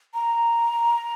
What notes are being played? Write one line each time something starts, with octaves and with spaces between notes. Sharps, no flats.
A#5